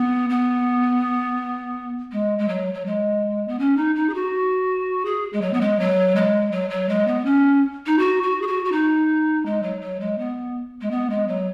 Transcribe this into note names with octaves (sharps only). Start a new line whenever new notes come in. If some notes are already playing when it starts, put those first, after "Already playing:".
Already playing: B3
B3
G#3
G#3
F#3
F#3
G#3
B3
C#4
D#4
D#4
G#4
F#4
G#4
G#3
F#3
B3
G#3
F#3
G#3
F#3
F#3
G#3
B3
C#4
D#4
F#4
F#4
G#4
F#4
F#4
D#4
G#3
F#3
F#3
G#3
B3
G#3
B3
G#3
F#3